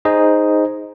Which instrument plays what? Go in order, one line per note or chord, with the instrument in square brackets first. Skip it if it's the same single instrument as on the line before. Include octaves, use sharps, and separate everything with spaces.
[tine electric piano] D#4 G#4 C5 D#5